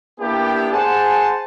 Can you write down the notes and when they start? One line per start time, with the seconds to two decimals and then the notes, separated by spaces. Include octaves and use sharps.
0.20 A#3 B3 D4 E4 G4
0.72 G#4 C5 F#5 G#5 A5